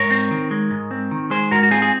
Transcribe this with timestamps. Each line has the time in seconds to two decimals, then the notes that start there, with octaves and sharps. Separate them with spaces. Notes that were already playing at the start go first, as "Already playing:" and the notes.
Already playing: G#2 A#4 C#5
0.11 C4
0.31 D#3
0.51 G#3
0.71 G#2
0.91 C4
1.11 D#3
1.30 G#3 G#4 C5
1.51 G#2 F#4 A#4
1.63 F#4
1.71 C4 F4 G#4
1.82 G#4